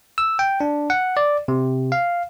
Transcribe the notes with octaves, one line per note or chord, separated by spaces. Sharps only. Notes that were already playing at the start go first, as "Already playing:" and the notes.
E6
G5
D4
F#5
D5
C3
F5